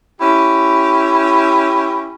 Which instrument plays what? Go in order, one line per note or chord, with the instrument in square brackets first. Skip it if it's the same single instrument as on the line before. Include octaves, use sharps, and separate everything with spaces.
[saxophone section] C#4 E4 G4